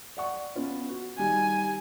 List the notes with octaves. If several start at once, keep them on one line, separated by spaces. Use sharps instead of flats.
D5 F#5 C#6
B3 C#4 F4
F#4
D#3 G3 D#4 G#5